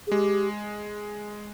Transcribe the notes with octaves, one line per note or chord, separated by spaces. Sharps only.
G#4
G#3 G4